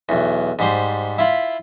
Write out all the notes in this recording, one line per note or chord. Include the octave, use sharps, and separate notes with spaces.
B1 E2
G#2 G3 C5
E4 F4 B5